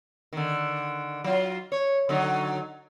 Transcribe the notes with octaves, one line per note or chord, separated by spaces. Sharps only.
D3 D#3
F#3 F4
C#5
D3 F#3 D#4